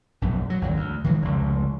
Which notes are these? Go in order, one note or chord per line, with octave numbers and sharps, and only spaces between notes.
A#1 F#2 B2
F#3
G#1 D#2 F#3
D2
D#3 F3 F#3 G#3
F1 C#2